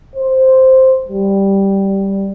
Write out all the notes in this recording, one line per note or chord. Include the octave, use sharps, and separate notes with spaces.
C5
G3